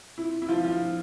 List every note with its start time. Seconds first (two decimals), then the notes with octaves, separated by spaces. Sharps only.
0.18 E4
0.42 E4
0.48 F3 F4
0.64 F3 F4